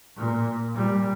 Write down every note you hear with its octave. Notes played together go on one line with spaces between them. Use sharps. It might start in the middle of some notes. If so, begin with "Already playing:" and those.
A#2
A#2 G3